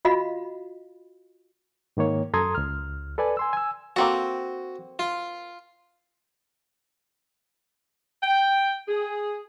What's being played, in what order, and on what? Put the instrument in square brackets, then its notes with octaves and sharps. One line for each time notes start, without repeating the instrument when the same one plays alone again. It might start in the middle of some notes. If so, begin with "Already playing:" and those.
[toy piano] F4 F#4 D#5 F5 B5
[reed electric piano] G#2 D#3 A#3 C#5
F#2 A4 A#5 C6 D#6 G#6
C#2 F6
A4 B4 D5 G#5
G#5 C6 E6
G#5 E6
[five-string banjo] A#3 C4 A4 [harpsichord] F#4
[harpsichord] F4
[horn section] G5
G#4